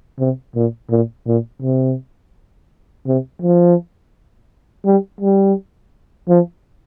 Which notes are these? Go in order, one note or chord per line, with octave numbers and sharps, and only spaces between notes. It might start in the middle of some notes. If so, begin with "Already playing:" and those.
C3
A#2
A#2
A#2
C3
C3
F3
G3
G3
F3